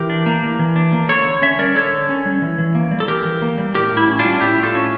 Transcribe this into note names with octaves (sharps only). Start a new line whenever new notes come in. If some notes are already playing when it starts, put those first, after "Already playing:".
Already playing: E3 G4 A#4
D4
A#3
E3
E3
D4
A#3
D3 A4 C#5
D3
C#4 C#5 E5
G3 A#4 D5
D3 A4 C#5
D3
C#4
G3
E3
E3
A#3
G3
A4
E3 G4 A#4
E3
A#3
G3
A2 G4 A#4
A2
E4
C#4
D4 F4
G3
A2 E4 G4
A2
F4 A4
C#4